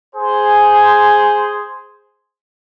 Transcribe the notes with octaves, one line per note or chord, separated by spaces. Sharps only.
G#4 C5